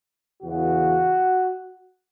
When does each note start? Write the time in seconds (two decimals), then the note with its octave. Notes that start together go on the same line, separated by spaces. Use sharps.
0.41 E2 C#3 E3 F#4